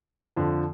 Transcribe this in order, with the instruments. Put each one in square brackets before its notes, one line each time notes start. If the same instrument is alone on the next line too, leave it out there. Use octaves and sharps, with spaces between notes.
[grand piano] F2 D3 F3